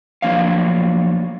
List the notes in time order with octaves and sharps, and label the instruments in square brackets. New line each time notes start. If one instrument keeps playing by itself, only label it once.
[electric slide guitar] F3 F#3 A#3 D4 C#5 F5